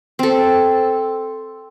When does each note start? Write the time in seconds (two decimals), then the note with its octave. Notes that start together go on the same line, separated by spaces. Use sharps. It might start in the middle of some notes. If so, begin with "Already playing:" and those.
0.19 C4 A4